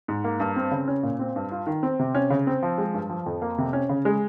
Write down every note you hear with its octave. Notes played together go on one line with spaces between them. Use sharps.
G#2
A#3
G2
C4
C#3
C#4
A#2
C4
G2
F4
D#3
C4
C3
C#4
C#3
C4
F3
G#3
G2
F3
F2
A#3
C3
C#4
C#3
G#3